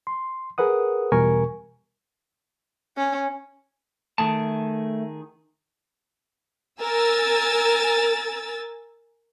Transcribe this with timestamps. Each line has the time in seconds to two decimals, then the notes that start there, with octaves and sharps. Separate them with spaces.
0.07 C6
0.58 G#4 A#4 B4 F#5 D#6
1.12 E2 B2 G3 A#4 G#5 C#6
2.97 C#4
4.18 D#3 A3 G#4 A5
6.80 A#4 G#5 E6 A6